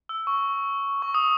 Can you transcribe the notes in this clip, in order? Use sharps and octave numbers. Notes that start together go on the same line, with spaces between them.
E6
C#6
C#6
D#6